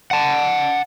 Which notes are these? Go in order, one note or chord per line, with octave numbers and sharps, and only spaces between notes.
F#5 A5